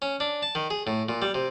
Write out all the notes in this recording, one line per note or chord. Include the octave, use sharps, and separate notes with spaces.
C#4
D4
A5
D#3
G#4
A2
A#2
G3
C3